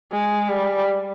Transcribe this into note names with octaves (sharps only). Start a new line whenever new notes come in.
G#3
G3